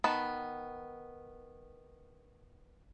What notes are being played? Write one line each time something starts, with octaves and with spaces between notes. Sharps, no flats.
D#3 B3 B4 A5